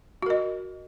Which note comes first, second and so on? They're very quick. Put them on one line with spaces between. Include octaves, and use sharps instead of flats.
F#4 A#4 D#5